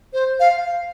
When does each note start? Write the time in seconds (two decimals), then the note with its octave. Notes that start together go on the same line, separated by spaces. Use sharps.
0.13 C5
0.40 F5